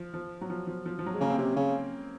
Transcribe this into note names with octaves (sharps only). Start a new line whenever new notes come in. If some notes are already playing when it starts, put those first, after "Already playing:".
Already playing: F3
F3
F#3
F3
F3
F3
F3
F#3
G#3
C#3 A#3
C4
C3 C#4
C#3 C#4